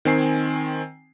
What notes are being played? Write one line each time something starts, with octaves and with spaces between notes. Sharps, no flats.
D#3 C4 G#5 C7